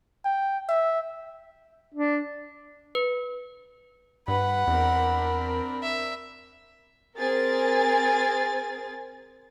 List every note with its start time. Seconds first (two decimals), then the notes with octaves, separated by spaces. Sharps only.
0.25 G5
0.69 E5
1.94 D4
2.95 B4
4.28 G2 B4 F#5 B5
4.67 E2 C4 D4 A#4
5.82 E5
7.17 C4 G#4 A#4 G#5 A6